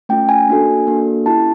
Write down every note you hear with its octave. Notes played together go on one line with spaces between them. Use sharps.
A3 C#4 F4 G5
G#5
A#3 D4 F#4 A4
A#3 D4 F#4 A4
C#4 E4 G4 A5